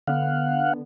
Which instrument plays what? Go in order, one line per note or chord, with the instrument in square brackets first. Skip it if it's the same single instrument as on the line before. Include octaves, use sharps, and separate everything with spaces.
[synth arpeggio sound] D3 B3 [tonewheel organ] F5 F#5